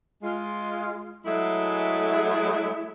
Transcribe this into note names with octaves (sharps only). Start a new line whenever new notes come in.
G#3 F4
F#3 G#3 A3 E4 G#4